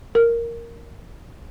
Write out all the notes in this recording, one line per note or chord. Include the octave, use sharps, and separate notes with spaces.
A#4